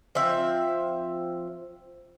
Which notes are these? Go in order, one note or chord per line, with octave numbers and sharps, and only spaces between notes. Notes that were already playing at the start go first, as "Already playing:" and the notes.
F3 C4 E5